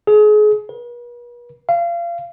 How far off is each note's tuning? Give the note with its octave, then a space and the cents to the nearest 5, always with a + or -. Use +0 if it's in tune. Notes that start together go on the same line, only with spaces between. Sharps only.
G#4 +30
B4 -45
F5 -30